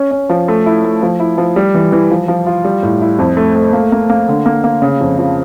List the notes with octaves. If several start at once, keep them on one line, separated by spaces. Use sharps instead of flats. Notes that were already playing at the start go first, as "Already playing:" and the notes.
Already playing: C#4
C#4
F3
A3
E4
A3
F3
E4
F3
G3
E3
E3
F3
F3
F4
G3
A2
E4
F2
A3
A3
A#3
A#3
A#3
D3
A#3
A#3
C#3
F2
F3